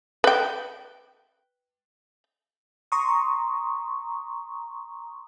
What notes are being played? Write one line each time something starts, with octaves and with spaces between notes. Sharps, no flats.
B4 G5
A#5 C6 C#6 D#6